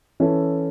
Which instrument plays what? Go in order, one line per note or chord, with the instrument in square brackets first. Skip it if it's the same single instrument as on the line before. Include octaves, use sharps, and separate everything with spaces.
[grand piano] E3 C#4 E4 A4